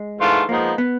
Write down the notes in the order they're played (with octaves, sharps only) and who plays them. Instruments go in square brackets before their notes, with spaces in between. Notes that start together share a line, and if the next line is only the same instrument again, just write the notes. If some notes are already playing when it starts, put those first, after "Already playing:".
Already playing: [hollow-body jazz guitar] G#3
[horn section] G#2 E3 A3 D4 F4
[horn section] F3 G#3 B3 D#4 [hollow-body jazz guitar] A#3
[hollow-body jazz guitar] B3